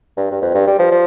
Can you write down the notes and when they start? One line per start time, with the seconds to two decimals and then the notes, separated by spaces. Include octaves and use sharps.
0.17 G2
0.31 G2
0.42 F2
0.54 G2
0.67 G3
0.79 F3
0.91 F3